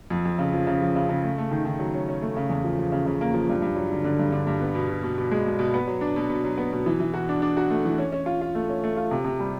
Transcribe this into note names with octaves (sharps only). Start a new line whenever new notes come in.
F2
F2
C#3
F3
C#3
F3
C#3
C#3
A3
A3
D#3
D#3
F#3
C#4
C#4
A3
C#3
E2
F3
F3
C#3
C#3
A#3
F3
G2
G2
F#3
D3
D3
G2
D3
G2
B3
B2
B2
B2
B2
G#3
B2
B2
B3
F#3
D4
B2
B2
F#3
B3
B2
E3
E3
F#4
D4
D4
F#4
A3
E3
C#4
C#4
F4
F4
A3
C#4
A3
F4
C3
C3
G3